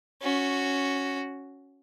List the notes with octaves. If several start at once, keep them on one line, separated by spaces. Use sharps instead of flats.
C#4 F#4